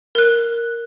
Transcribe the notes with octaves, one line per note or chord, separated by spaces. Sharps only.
A#4 F#6